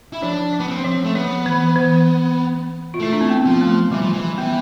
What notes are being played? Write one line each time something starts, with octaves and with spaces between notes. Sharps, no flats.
E4
F3 D4
F3
B3
C4
F3
A3
F3 B3
E3
E3
F4
A3 E4
D4
C4
B3
F3
A3
E3 G3
F3
E3
E3 B3